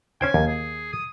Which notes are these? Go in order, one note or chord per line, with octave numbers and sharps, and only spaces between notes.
C#4 C5 G5 G#5
D#2
G#4
D#6